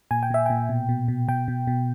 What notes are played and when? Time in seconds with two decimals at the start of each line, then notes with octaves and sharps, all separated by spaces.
0.11 A#2 G#5
0.23 G5
0.30 A#2 E5
0.46 A#2 G5
0.69 B2
0.89 B2
1.08 B2
1.28 B2 G5
1.48 B2
1.67 B2